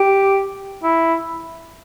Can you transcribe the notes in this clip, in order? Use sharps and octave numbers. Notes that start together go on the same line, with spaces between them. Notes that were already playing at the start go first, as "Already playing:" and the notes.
Already playing: G4
E4